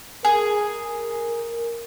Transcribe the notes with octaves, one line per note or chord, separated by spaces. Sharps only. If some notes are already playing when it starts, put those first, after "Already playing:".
G#4 A#4